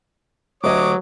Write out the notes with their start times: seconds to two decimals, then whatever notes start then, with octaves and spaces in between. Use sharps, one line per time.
0.64 D2 F#3 G4 C#5 D#5 D6 D#6